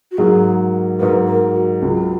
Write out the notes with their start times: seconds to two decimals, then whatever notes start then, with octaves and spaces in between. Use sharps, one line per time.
0.11 F#4
0.18 G#2 F#3 A#3 G#4
0.99 G#2 F#3 A#3 B4
1.27 A#4
1.54 F#4
1.81 C#2 C#3 F#3 F4